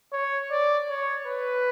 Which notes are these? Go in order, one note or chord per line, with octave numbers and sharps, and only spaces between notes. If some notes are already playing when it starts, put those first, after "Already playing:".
C#5
D5
C#5
B4